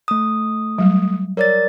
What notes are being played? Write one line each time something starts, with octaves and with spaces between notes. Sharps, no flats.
A3 D#6
F#3 G3
A#4 C#5 D5 A6